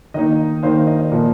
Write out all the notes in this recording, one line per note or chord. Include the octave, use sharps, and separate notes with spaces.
D#3 A#3 D#4 D#5
D#3 A#3 D#4 C5 F5
D#5
D#5
A#2 F3 A#3